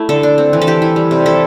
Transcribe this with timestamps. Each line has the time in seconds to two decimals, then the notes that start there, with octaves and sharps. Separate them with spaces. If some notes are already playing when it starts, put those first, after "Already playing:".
Already playing: A3 E4
0.09 D3 A4
0.23 D4
0.38 C4
0.53 E3
0.61 A4
0.67 E3 G4
0.82 E4
0.96 G3
1.11 C3
1.26 E4 A4